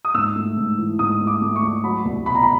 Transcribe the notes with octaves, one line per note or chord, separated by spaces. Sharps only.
D#6
G#2 E6
A3
G#2
E3
G#2 D#6
A3
D6
A3
C#6
A3
F#3 B5
C2
B2 B5
A#5
B5